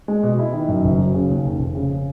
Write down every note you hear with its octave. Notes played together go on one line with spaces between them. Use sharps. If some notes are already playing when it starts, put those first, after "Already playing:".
G#3
B2
E4
D#3
F#2
F#1
F#3
C#3
D#2
F1
F1
C#3